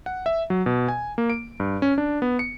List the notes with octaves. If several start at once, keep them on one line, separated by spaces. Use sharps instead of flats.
F#5
E5
F#3
B2
G#5
A#3
D7
G2
C#4
D4
B3
C#7